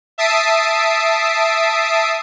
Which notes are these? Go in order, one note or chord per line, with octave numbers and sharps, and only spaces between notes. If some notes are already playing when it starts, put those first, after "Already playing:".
E5 A5 D#6 B6 C7 D7